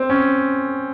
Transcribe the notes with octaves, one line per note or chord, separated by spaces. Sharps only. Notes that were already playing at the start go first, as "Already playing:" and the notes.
Already playing: C4
C#4